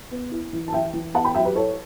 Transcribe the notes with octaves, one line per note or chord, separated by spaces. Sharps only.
B3
E4
E3
A5
E3 E5 G5
E3
B3 F#5 A5
G5 B5
F#3 E5 G5
G4 B4
E4 A4 C#5